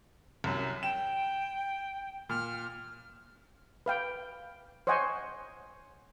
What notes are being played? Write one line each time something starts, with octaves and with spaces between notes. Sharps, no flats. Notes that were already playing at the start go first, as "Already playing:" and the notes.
C2 F#2
G5 E7
A#2 F6
B4 F5 G5
C5 C#5 D#5 F#5 G#5